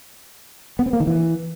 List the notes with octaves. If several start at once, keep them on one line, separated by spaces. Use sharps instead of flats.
B3
C4
A#3
D#3
E3